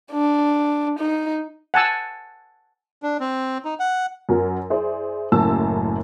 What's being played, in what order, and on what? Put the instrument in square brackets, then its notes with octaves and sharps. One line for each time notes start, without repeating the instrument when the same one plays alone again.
[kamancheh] D4
D#4
[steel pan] F#5 G#5 A5 E6
[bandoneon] D4
C4
D#4
F#5
[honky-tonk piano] F#2 F#3 A#4
E4 G#4 C5 D5
F#1 F#2 A2 C#4 A5 E6